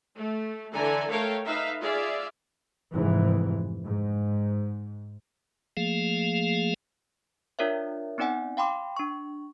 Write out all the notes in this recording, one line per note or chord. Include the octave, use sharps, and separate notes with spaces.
A3
D3 E3 A4 G#5 A#5
A3 A4 A#4 C#5 F5 G5
D#4 B4 E5 F5
F4 G#4 D5 E5 F5
F1 G#2 E3
G#2
F3 A3 A#3 G#4 F5
D4 F4 A#4 C#5 D5 E5
B3 C4 D#4 D5 F#5 G#5
F5 G5 B5 C6 D6
D4 C#6